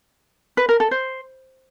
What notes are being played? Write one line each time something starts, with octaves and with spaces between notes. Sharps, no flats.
B4
A#4
A4
C5